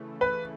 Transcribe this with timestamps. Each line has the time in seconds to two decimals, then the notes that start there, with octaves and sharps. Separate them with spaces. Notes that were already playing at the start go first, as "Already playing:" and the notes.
Already playing: C#3 E3 A3
0.21 B4